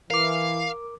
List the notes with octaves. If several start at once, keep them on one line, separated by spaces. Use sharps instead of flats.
E3 A#4 F5 D6